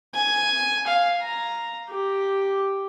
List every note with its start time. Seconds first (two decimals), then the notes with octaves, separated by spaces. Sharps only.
0.14 G#5
0.87 F5
1.21 A#5
1.90 G4